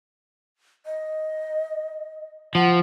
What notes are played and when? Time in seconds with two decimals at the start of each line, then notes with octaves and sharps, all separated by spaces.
0.86 D#5
2.55 F3 F#5